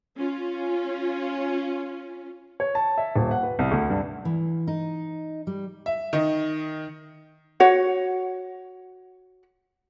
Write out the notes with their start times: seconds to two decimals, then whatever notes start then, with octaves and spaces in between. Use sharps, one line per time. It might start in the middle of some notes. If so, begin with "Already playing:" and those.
0.18 C#4 F4
2.60 C#5
2.75 A5
2.98 E5
3.16 D#1
3.31 F#5
3.43 B4
3.59 C2
3.71 D2
3.90 G2
4.25 E3
4.68 D#4
5.47 G3
5.86 E5
6.13 D#3 D#5
7.60 F#4 C#5 F#5